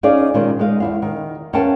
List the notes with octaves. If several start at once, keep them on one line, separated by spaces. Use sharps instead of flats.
C#4 D#4 G#4 D5 F5
A#2 D#3 G#3 C#4
G#3 D#4 F5
E2 E4 F5
D#3
E2 C#4 A#4 F5 G5 A5